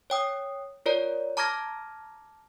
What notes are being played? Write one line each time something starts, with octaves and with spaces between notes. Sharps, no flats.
C#5 G5 D#6
F4 A#4 C#5 D5 A#5
A5 A#5 D6 F6 G#6 A#6